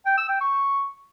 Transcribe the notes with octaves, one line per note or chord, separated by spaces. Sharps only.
G5
E6
G5
C#6